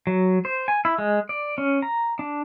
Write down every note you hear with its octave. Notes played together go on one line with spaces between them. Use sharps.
F#3
C5
G#5
E4
G#3
D5
C#4
A#5
D4